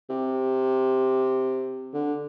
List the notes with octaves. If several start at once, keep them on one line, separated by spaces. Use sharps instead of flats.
C3
D3